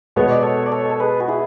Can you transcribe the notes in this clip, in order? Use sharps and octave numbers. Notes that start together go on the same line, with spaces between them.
B2 G#3 B3 C#5
D5
A4 C#5
D5
A4 C#5
A4
G#4 B4
F#4
E4 G#4